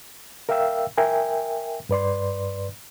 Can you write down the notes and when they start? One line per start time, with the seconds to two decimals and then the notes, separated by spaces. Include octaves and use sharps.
0.49 A#4 E5 F5 G5 E6
0.98 A#4 E5 G5 G#5
1.89 G2 B4 D5 C6